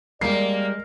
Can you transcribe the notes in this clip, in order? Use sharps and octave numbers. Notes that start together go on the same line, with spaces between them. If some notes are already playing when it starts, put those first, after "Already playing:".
G3 G#3 A#3 A#4 D5 C7